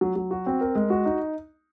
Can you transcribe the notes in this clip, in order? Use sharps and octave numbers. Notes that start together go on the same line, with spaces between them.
F#3
F#3
F#4
C4
A#4
G#3
F#4
D#4